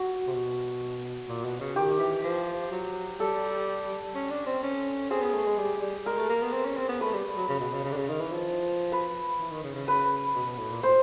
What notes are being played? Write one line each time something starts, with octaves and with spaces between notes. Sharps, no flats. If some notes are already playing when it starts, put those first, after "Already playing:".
Already playing: F#4
C3
B2
A#2
B2
C#3
D#3 G4
E3
F3
F#3
G3 A4
C#4
D4
C4
C#4
C4 G#4
B3
A3
G#3
G3
G3
G#3 A#4
A3
A#3
B3
C4
C#4
C4
B3
A3 B4
G3
F#3
C#3
B2
C#3
C#3
D3
C#3
D#3
E3
F3
B4
E3
D#3
C#3
C#3
B4
B2
B2
A2
A#2
A2 C5